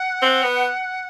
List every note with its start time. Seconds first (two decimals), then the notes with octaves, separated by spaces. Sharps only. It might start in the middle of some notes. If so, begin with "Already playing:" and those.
Already playing: F#5
0.22 C4
0.43 B3